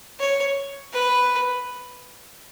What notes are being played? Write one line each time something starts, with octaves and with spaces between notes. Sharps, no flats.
C#5
B4